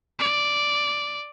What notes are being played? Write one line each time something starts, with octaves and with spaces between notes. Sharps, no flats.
D5